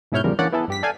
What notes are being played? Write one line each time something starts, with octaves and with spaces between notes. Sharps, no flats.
G#2 B2 E4 C#5 F6 G6
E2 C#3 F3 G3 A#4
E3 A#3 C#4 D4 D5 F#5
B3 E4 G#4 A4
G2 G4 B6
A4 D5 F5 G5 G#5